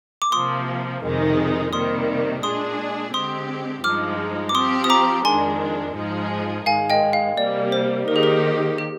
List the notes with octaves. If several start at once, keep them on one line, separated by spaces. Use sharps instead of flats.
D6
C3 F3 A#3 C6 D#6
F2 C3 D#3 G#3 D#4
C3 D#3 G3 A#3 C6 D#6
A#2 G#3 D4 G#4 C6 D#6
D3 G#3 C4 G4 C6 D#6
G2 F3 G#3 D#4 D6 F6
D6
F3 C4 G4 C6 D#6
D#6
A#5 D6
F2 D#3 G#3 D4 G#5 C6
G#2 F3 G#3 D#4 G#4
G#2 D#3 G#3 F5 G#5
D#5 G5
F5
C3 G3 A#3 D5
C5
D#3 A#3 D#4 G4 A#4
G#4
A#4
G4